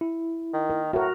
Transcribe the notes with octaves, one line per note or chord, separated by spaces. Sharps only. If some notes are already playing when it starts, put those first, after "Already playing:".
E4
D#3
A#4
A2 F#4 A#4